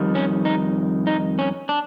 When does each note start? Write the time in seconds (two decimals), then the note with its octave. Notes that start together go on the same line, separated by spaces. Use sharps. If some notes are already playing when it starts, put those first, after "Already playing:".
Already playing: F2 D#3 G3
0.15 C#4
0.45 D#4
1.07 D#4
1.39 C#4
1.69 D4